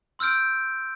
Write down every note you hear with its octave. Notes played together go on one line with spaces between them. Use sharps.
C6 E6 F6 G6 D7